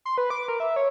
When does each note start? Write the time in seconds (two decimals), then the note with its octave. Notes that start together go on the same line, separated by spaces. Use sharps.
0.05 C6
0.18 B4
0.30 D6
0.48 A#4
0.60 E5
0.76 C#5